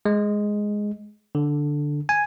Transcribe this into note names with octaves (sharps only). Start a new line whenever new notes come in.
G#3
D3
G#5